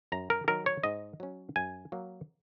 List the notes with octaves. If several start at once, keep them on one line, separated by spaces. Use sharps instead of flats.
F#2 A#5
A#4
D#3 F#3 A#4
C#5
G#2 D#5
F#3 C#4
F#2 G#5
F#3 A#3